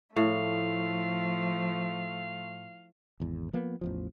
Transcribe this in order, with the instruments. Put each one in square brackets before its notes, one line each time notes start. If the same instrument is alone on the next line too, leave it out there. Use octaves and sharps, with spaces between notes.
[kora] A2 [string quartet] F3 A3 [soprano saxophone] F5
[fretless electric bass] G#1 E2
F3 A#3 B3
A1 E2 F3